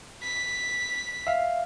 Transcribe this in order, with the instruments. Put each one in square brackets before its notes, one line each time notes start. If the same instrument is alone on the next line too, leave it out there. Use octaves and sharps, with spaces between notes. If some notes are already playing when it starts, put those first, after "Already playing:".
[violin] B6
[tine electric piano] E5 F5